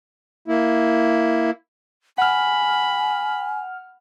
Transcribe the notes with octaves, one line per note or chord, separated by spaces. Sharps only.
A#3 E4
F#5 G#5 B5 F6